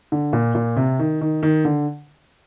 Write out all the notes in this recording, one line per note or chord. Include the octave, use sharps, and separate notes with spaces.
D3
A#2
A#2
C3
D#3
D#3
D#3
D3